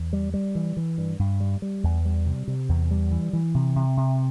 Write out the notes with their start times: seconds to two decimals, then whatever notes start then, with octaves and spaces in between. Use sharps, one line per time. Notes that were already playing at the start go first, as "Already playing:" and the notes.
Already playing: E2
0.13 G3
0.34 G3
0.55 E3
0.77 E3
0.98 G2
1.19 G2
1.40 G3
1.62 G3
1.83 E2
2.05 G3
2.26 C3
2.48 C3
2.69 E2
2.91 G3
3.11 E3
3.33 E3
3.55 C3
3.76 C3
3.97 C3